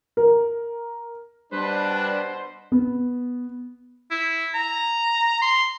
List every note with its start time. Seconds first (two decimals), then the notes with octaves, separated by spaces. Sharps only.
0.17 A#4
1.53 B2 G3 D4 B4 C5
2.72 B3
4.11 E4
4.54 A#5
5.42 C6